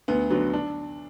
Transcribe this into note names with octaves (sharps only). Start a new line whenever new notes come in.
D2 B3
D3 F#3 B3
D4